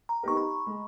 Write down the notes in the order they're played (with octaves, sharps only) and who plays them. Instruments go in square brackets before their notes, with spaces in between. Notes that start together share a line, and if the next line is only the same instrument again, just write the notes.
[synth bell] A#5
[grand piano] B3 D#4 G4 A#4 [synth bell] C#6
[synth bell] B5
[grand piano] G#3